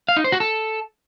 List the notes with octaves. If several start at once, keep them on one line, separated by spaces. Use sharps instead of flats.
F5
D#4
C5
F#4
A4